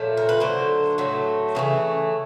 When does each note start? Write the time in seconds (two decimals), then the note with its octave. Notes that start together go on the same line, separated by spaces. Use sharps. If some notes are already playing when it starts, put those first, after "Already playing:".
Already playing: A#2 F3 A3 C#5
0.17 A#4
0.29 B4
0.40 D3 F#3 A3 C5
0.98 A2 F#3 A3
1.55 C#3 E3 A3